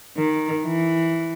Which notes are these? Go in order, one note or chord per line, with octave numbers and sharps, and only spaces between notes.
D#3
E3